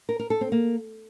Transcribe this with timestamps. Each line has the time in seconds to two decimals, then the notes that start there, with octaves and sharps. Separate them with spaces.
0.09 A#4
0.19 A#4
0.30 A4
0.41 C4
0.52 A#3